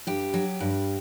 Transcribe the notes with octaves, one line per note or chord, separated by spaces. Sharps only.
G2 G4
F#3
G2